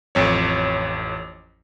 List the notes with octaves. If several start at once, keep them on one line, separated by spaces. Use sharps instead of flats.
A1 F2 C#5